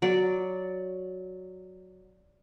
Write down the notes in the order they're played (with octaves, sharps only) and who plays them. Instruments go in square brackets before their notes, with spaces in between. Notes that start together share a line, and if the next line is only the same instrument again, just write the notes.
[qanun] F#3 D5